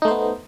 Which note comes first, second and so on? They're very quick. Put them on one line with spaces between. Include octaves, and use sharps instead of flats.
D#4 A3 C5 B3